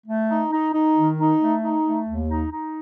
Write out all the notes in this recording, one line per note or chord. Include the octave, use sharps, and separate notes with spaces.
A3
D#4
D#4
D#4
D#3
D#4
A3
D#4
A3
D#2
D#4
D#4